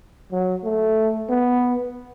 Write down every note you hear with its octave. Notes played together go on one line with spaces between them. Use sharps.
F#3
A3
B3